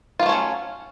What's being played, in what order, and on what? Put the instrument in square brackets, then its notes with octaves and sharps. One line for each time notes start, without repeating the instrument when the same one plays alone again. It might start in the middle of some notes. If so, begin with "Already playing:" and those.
[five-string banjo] F4
A#3
A3
C#4
F#3